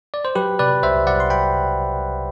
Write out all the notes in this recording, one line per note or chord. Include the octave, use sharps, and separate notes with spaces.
D5
C5
F#3 G4 B4
C3 B4 D5
C2 C5 E5
C2 D5 F#5
C6
F#3 G5 B5
C3
C2
C2